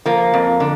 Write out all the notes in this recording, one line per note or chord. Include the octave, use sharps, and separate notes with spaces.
F3 A#3
F2
D3